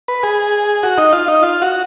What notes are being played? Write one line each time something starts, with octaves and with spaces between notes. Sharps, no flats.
B4
G#4
F#4
D#4
F4
D#4
F4
F#4